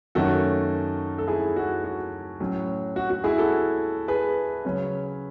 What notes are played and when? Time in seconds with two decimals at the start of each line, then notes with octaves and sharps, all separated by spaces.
0.15 F#2 D#3 A3 C#4 F#4 A4
1.18 A4
1.27 E4 G#4
1.56 F#4
1.84 F#4
2.40 A2 F#3 C#4
2.96 F#4
3.10 F#4
3.24 E4 G#4
3.38 F#4 A4
4.08 G#4 B4
4.65 C#3 F#3 C#4